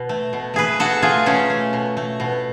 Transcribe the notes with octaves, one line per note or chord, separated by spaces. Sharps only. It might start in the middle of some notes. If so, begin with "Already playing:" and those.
Already playing: B2
A3
B2
A3 G#4 B4
B2 F#4 A4
A3 F4 G#4
B2 A3 C#4
A3
B2
A3
B2